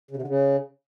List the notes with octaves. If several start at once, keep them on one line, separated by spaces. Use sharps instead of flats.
C#3
C3
D3
C#3